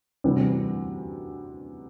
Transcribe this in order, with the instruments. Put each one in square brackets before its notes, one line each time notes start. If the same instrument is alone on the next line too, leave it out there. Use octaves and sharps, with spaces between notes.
[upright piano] D2 C3 E3 G3 C4